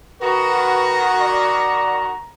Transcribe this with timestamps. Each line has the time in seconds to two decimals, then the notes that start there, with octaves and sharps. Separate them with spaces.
0.22 D#3 F#4 B4 A#5
1.22 D5